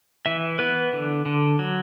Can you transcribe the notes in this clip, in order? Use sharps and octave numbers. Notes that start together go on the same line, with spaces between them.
E3 E5
B3 B4
D3
D3
F#3